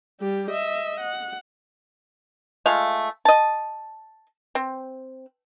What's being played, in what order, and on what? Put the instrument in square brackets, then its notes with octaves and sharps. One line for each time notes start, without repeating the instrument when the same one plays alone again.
[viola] G3 G4
D#5 E5
F#5
[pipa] G#3 A3 F4 F5
D#5 A5
C4